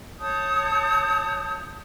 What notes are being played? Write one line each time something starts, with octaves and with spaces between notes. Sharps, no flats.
C#5 A5 D#6 G6